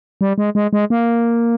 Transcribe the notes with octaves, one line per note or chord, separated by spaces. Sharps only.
G3
G#3
G#3
G#3
A#3